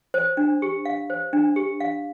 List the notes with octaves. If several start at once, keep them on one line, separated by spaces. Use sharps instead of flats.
C5
D4
G4
F5
C5
D4
G4
F5